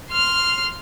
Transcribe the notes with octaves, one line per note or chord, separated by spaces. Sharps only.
C6 F6